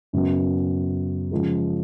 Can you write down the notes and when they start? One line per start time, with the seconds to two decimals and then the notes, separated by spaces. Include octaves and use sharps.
0.13 F#2 C#3 F#3 B3
1.32 C#3 F3 G#3